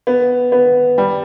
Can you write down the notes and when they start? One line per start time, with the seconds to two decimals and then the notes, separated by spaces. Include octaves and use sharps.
0.07 B3
0.52 B3
0.98 G3